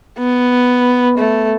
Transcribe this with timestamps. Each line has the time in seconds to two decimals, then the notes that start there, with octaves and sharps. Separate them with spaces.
0.19 B3
1.18 A3